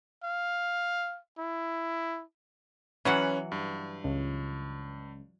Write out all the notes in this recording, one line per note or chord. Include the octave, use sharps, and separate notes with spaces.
F5
E4
E3 F#3 C#4 B4 C#5 F#5
G2
C#2